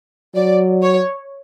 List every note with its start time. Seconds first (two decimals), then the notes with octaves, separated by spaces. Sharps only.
0.35 F#3 D5
0.83 C#5